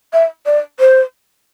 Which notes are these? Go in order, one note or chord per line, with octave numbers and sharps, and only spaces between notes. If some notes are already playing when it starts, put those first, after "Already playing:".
E5
D5
C5